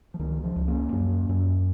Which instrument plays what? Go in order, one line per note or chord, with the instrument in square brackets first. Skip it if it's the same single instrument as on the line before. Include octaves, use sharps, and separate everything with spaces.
[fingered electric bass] F3
C#2 D#3
F3
C#2
A#3 C#4
F#2
F#2